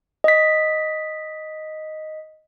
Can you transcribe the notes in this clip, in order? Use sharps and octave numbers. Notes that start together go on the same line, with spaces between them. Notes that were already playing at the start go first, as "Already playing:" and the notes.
D#5 B6